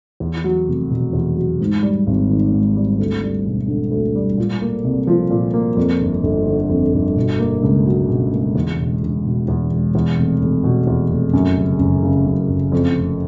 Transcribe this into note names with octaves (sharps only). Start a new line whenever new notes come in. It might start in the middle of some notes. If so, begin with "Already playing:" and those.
E2
F#3
F1
B2
E2
F#3
G#2
G3
G#1
D#3
G#2
G3
D2
G3
E1
D3
D2
G3
A#2
A#3
C2
F3
A#2
A#3
F2
G1
G1
D3
F2
G1
B2
A#3
C#2
F#3
B2
A#3
E2
E1
E1
B2
E2
E1
E2
F1
F1
B2
E2
F1
F#2
F#1
F#1
C#3
F#2
F#1
F2
F1